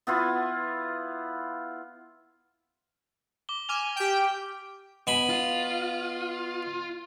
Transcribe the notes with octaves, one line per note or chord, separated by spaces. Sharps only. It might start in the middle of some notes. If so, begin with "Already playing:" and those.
B3 E4 F4
D6 G7
G#5 D6 F6 F7
G4 G5
B2 G#5 B5
F4